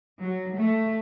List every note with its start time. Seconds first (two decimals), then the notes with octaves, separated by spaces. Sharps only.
0.20 F#3
0.57 A3